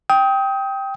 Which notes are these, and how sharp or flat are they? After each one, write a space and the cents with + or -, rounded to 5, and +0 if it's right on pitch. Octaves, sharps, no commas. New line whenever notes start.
G5 +0 D#6 +30